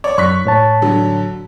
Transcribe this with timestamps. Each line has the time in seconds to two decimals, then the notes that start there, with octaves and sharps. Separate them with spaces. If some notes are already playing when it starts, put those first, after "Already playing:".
0.04 C#5 D5
0.18 F#2 C#6 F#6 B6
0.45 A2 C#5 A5
0.82 D3 F#3